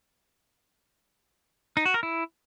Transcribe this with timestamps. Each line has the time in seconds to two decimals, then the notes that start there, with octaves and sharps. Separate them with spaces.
1.77 D#4
1.85 F#4
1.94 A#4
2.03 E4